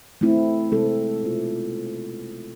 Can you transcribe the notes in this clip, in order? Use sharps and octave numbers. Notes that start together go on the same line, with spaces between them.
A3 C4 E4
C3 G#3 C4 E4 A4
B2 B3 F4